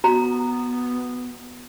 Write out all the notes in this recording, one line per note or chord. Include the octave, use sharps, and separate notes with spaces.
B3 F#4 A#5